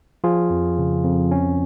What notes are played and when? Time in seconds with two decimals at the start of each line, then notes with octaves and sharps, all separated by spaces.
0.24 F3 F4 G#4
0.50 F2
0.78 C#3
1.04 F2
1.31 C#4